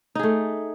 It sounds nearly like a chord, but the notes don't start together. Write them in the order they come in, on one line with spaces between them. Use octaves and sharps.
D#4 G#4 A3